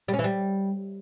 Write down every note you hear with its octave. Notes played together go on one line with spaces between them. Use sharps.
G3
C#4
E3
G3